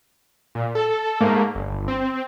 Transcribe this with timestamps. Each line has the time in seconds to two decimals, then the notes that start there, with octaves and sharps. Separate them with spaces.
0.55 A#2
0.75 A4
1.21 G#2 A3 A#3
1.55 G1
1.88 C4